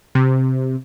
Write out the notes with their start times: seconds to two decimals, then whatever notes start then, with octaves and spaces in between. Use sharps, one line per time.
0.15 C3